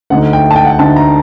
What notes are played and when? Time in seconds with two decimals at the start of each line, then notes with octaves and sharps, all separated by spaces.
0.10 D2 D3 A3 D#4 F#5
0.33 G5
0.51 A5
0.56 G5
0.65 F#5
0.72 G5
0.79 D2 D3 A3 D#4 A5
0.96 A#5